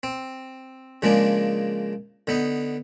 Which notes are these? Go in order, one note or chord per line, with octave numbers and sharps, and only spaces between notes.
C4
C#3 F3 G#3 A#3 D4
D3 B3 D#4